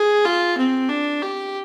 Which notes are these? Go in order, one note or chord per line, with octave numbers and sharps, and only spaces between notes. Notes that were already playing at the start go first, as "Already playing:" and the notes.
Already playing: G#4
F4
C4
D4
G4